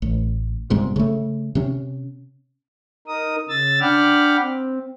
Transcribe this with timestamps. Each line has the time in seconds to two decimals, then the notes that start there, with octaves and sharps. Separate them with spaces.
0.02 A1
0.70 G1 G#2 C3
0.96 C#3 A3
1.55 C3 C#4
3.08 D#4 A#4 D#6
3.49 C#3 E6 A6
3.81 D4 F#5 G5 B5 D6 F6
4.40 C4